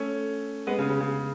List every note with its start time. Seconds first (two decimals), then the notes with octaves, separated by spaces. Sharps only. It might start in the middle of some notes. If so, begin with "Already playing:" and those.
Already playing: A3 C#4
0.67 G#3 B3
0.78 C#3
0.89 C#3
1.00 C#3